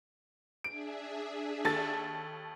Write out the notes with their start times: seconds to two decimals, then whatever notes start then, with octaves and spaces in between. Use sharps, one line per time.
0.64 D4 G#4 E5 D7
1.65 D#2 A4 A6